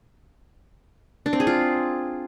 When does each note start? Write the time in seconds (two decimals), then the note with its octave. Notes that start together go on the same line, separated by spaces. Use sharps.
1.26 D4
1.33 C4
1.40 G#4
1.47 F4